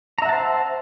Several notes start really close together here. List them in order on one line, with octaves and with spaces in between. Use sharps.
A#5 E5 F#5 A5 C5